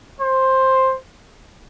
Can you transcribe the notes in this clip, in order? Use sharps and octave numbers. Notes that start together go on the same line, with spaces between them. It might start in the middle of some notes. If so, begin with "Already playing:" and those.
C5